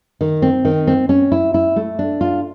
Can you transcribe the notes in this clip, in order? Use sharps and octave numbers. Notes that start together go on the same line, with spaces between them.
D#3
C4
D#3
C4
C#4
E4
E4
A3
D4
F4